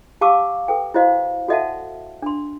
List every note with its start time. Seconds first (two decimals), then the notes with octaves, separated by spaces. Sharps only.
0.21 G4 F5 A5 C#6 D6 E6
0.68 A4 B4 G5
0.94 E4 F#4 C5 D#5 F5
1.48 F#4 A4 D#5 E5 F#5 A5
2.22 D4 C6